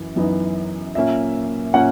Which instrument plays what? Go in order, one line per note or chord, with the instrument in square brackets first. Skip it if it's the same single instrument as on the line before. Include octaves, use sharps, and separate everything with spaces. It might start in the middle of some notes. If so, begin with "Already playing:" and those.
Already playing: [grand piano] F#2 E3
F#2 E3 B3 D#4
A#2 A#3 C#4 E5
A#2 A#3 C#4 F#5